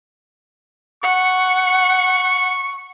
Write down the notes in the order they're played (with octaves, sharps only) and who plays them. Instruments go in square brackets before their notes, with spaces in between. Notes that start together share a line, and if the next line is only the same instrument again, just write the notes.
[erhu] F#5 [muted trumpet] C#6